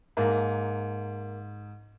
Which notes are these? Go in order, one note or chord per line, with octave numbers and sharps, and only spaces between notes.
G#2 A#3 A5 A#5